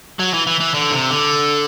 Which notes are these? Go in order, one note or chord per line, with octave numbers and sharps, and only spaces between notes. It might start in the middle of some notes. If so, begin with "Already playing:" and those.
F#3
E3
E3
E3
D3
C3
D3